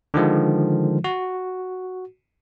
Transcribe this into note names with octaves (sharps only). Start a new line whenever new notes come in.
D3 D#3 F3 G#3
F#4